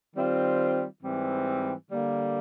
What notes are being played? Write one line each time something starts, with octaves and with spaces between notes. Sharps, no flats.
D#3 G3 C4 F4
G#2 E3 G3 C4
D3 G3 A#3